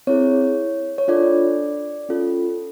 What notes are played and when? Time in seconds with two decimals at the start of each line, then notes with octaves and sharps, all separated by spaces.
0.07 C4 E4 G#4 C#5
0.98 C#5
1.08 D4 F4 A4 D5
2.09 C#4 F4 A4